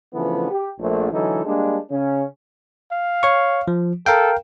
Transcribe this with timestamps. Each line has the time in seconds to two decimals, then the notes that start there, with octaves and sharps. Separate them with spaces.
0.14 C#3 E3 F3 A3 B3 D4
0.51 G4
0.80 A#1 A3
1.11 D3 E3 F#3 G#3 D#4 A4
1.45 G3 G#3 A#3 D4
1.91 C#3 C#4
2.92 F5
3.23 C#5 C#6
3.68 F3
4.06 A4 A#4 F5 G5